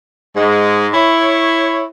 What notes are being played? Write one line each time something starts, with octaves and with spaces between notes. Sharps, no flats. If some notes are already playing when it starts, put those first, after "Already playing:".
G#2 G#3
E4 C#5